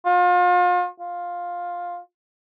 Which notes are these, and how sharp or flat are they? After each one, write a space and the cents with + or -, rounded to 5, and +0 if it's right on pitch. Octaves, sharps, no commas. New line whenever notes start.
F4 +35
F4 +10